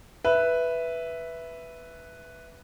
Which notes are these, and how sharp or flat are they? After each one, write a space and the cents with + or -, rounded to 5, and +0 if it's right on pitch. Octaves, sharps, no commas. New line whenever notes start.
B4 +0 E5 +0